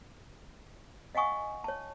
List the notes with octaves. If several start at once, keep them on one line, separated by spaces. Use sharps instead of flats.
D#5 F5 F#5 G#5 C#6 D#6
C#5 A5